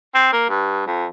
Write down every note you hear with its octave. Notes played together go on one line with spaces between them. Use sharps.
C4
A#3
G2
F2